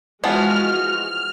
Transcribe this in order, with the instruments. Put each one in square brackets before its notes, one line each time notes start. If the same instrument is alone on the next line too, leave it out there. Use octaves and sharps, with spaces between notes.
[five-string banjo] E3 F3 B3 [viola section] G#3 F#4 [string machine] F6